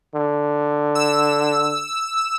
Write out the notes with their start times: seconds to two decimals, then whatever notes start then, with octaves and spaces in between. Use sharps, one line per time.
0.15 D3
0.95 E6